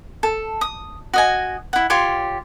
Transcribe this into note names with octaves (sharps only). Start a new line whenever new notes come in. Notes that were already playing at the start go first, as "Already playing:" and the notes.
A4
D#6
F#4 D#5 G#5
E4 F#5
F4 G4 C#5 C6